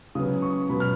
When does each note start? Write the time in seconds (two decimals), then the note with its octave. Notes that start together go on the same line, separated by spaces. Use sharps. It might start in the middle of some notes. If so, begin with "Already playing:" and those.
0.15 C#3 F#3 B3 D#6
0.42 C#6
0.69 B2 F#3 B3 B5
0.80 F6